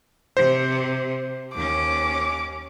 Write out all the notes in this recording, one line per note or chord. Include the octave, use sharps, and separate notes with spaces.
C3 C5
D#2 C#4 D6